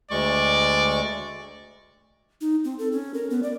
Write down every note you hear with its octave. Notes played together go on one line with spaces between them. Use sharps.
D2 G#3 D5 C#6
D#4
C4
A4
C#4
A#4
B3
D5